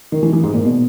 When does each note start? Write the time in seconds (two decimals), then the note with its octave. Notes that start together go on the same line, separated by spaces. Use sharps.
0.12 D#3
0.23 E3
0.33 E3
0.43 G#2
0.54 A#2
0.64 B2